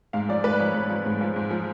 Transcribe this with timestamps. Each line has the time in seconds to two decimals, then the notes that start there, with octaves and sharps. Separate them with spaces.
0.13 G#2 F5
0.29 F3 D5
0.44 G#2 B4
0.59 F3 C#5
0.74 G#2
0.89 F3
1.06 G#2
1.21 F3
1.36 G#2
1.51 F3